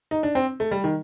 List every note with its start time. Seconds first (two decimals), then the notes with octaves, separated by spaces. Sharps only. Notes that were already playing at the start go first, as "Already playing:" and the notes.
0.11 D#4
0.23 D4
0.35 C4
0.60 A3
0.71 G3
0.84 D#3